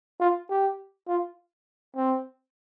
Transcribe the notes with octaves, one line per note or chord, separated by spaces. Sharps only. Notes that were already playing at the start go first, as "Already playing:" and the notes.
F4
G4
F4
C4